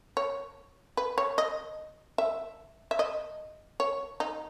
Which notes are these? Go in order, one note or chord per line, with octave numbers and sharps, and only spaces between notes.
C#5
B4
C#5
D#5
E5
E5
D#5
C#5
D#4